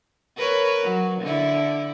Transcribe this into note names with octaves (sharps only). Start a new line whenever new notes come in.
A#4 B4 C#5
F#3
D3 E4